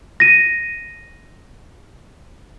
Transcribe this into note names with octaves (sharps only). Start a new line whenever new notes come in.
A#6 D#7